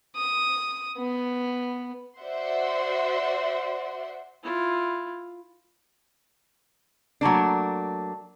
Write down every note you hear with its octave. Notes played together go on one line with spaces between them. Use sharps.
D#6
B3
F#4 C5 D5 E5 F#5 C6
E4 F4
F#3 A3 A#3 D4